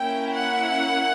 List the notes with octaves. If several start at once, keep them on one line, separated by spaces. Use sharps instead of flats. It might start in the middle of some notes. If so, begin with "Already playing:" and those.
Already playing: A#3 C#4 E4 G5
F#5